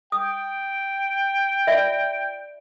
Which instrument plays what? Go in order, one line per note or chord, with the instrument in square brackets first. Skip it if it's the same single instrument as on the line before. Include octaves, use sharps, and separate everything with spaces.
[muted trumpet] G5 [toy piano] D#6
[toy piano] F4 D5 E5